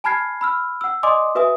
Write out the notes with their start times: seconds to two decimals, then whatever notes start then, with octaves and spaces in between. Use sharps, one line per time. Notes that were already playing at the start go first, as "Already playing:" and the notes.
0.04 G#5 A5 B5 F6 G#6 C7
0.41 B5 E6 F6
0.81 F#5 E6
1.03 D5 D#5 G#5 C6 D6 D#6
1.35 F#4 B4 E5 G#5 D#6